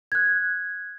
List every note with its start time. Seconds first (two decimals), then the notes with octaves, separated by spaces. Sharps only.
0.12 F#6 G#6